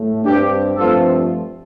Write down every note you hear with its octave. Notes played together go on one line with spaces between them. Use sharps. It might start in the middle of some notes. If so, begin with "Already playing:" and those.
Already playing: A2 A3
G2 G3 C4 D4 G4
G2 F3 A3 C4 F4 A4